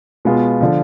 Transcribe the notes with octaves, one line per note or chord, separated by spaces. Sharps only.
B2 G#3 B3 F4
D3 F3